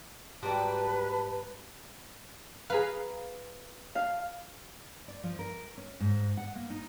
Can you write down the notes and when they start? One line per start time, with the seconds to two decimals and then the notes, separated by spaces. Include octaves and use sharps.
0.43 G#2 G3 F#4 G4 B4 D5 A5
2.70 G#4 B4 F5 A#5
3.95 F5
5.08 D5
5.23 F3
5.39 A#4
5.78 C#4
6.00 G#2
6.37 F#5
6.56 A#3
6.70 D#4